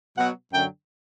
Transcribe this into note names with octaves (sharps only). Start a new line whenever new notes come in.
B2 F#3 F#5
F#2 D3 F#3 G5